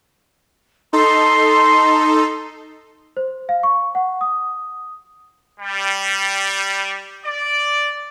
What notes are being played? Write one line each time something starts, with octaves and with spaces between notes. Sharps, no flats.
D#4 A4 C6
C5
F5
C#6
F#5
D#6
G3
D5